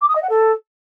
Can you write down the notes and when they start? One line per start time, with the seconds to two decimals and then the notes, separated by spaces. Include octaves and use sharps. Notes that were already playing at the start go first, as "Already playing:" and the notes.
0.01 D6
0.08 D#6
0.15 D#5
0.23 F#5
0.30 A4